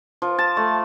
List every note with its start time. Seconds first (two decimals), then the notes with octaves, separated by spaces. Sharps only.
0.22 F3
0.39 A5
0.57 A3